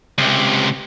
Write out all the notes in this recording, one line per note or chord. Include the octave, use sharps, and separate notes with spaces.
C#2 C3